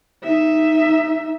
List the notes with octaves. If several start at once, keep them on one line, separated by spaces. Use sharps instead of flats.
D#4 E5